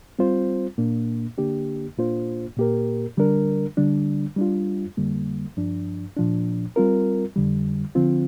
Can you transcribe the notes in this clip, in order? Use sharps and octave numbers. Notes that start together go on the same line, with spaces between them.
G3 C4 F4 C5
A#2 A#3 D4
D3 A#3 D4 G4
A#2 A#3 D4 F4 C5
A#2 A#3 G4 A#4
D3 G3 D4 A#4
D3 G3 D4
G3 D4 F4
F2 D3 G3 A#3
G2 F3 D4
A#2 F3 D4
G3 C4 F4 A#4
F2 D3 G3
D3 F3 C4 F4